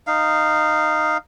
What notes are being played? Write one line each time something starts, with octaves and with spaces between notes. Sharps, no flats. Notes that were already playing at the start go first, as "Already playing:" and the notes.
D#4 F5